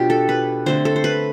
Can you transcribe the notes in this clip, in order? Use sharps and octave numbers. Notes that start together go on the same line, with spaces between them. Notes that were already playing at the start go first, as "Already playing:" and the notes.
Already playing: B2 A3 C4 D4 F4 G4
A4
B4
D3 A3 C4 C5
A4
C5
B4